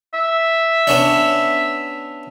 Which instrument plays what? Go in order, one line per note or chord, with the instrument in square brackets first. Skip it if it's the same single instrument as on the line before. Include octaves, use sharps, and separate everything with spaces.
[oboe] E5
[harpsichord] B3 C#4 D4